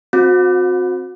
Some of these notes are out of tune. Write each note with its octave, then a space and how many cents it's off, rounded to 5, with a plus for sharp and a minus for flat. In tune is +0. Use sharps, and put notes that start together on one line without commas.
C4 +0 F#4 -30